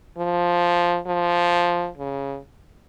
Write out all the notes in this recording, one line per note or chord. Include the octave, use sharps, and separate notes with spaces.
F3
F3
C#3